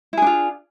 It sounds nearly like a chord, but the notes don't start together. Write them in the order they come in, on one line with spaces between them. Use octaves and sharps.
E4 G#4 D4 F4